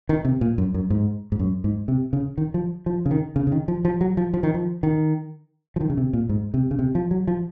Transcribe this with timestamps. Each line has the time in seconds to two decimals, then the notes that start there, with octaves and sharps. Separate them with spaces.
0.09 D#3
0.25 C3
0.41 A#2
0.58 F#2
0.74 F#2
0.90 G#2
1.32 G#2
1.39 F#2
1.64 G#2
1.88 C3
2.13 C#3
2.38 D#3
2.54 F3
2.86 F3
3.06 C#3
3.11 D#3
3.36 C#3
3.47 C#3
3.52 D#3
3.68 F3
3.85 F3
4.01 F#3
4.17 F3
4.34 F3
4.43 D#3
4.54 F3
4.83 D#3
5.76 F3
5.81 D#3
5.90 C#3
5.97 C3
6.13 A#2
6.29 G#2
6.54 C3
6.71 C#3
6.79 C3
6.95 F3
7.11 F#3
7.27 F3